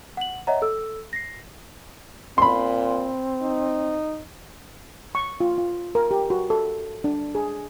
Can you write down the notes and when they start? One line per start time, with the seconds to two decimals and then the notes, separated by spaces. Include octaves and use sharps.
0.17 F#5 F#7
0.47 C#5 D#5 E5 F#5 A#5
0.62 A4 E6
1.13 A#6 C7
2.38 A#2 C4 B5 C6
3.42 D#4
5.15 C#6
5.40 F4
5.58 F4
5.95 A#4
6.11 G4
6.30 F#4
6.50 A4
7.04 D4
7.35 G#4